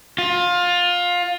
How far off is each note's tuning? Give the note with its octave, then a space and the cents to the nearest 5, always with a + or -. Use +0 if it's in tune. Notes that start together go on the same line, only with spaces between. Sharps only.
F4 +20